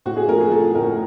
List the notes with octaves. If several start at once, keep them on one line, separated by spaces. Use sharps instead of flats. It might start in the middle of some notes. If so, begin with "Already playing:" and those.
A2 F#4
G#4
F3 A#4
G#4
F3 A4
A2 A#4